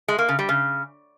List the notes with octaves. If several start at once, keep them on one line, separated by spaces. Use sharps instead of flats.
G#3
A#3
C#3
G3
C#3